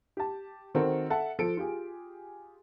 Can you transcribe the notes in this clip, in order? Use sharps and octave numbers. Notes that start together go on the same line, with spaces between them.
G4 A5
D#3 C4 F#4 A4 A#4 C5
A4 E5 F#5 A5
F3 A4 D7
F4 G4 G#4